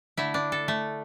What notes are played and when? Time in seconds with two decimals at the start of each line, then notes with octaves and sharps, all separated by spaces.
0.17 D3 A3 E4
0.34 D4
0.52 A4
0.68 A3